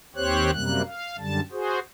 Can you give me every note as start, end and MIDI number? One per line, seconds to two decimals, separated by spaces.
0.16 0.51 39
0.16 0.51 60
0.16 0.51 67
0.16 0.51 72
0.16 0.51 73
0.16 0.51 90
0.53 0.82 42
0.53 0.82 48
0.53 0.82 55
0.53 0.82 58
0.53 0.82 90
0.86 1.16 77
1.18 1.40 42
1.18 1.40 50
1.18 1.40 55
1.18 1.40 81
1.52 1.79 66
1.52 1.79 68
1.52 1.79 72